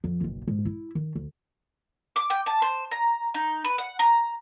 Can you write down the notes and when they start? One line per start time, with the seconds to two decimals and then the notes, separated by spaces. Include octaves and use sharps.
0.04 F2
0.21 F#1 B1
0.48 G#2
0.65 E4
0.95 D#3
1.16 D2
2.16 D6
2.30 G5
2.46 A5
2.62 C5
2.91 A#5
3.34 D#4
3.64 B4
3.78 F#5
3.99 A#5